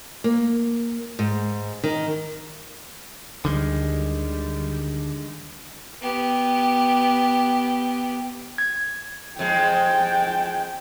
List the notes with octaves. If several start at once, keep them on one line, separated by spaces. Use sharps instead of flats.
A#3
G#2
D#3
D2 D3 D#3 G3 G#3
B3 G4
G#6
F2 G#3 G5